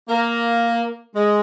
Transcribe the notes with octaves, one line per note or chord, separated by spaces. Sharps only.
A#3
G#3